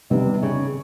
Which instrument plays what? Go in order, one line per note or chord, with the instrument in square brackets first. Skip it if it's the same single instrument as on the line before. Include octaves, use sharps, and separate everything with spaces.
[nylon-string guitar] C3 [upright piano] D#3 G3 B3 D#4
[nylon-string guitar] C#3